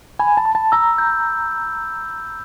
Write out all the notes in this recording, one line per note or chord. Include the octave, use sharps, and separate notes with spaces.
G#5 B5
A5
B5
A5
A#5 E6
G6